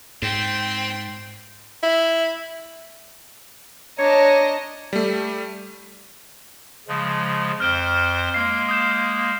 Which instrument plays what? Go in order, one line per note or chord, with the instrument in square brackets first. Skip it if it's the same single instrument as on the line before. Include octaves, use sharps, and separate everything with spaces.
[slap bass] G#2 [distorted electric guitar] C4 [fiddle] G5 C6
[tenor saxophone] E4
[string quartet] D4 D#5 A#5 [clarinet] C#5
[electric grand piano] G3 A3
[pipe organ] C#3 F3 G#3
[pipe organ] F2 C5 [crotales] F6 D7 G7
[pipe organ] G#3 A#3 [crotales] C7
[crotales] D#6 G6 E7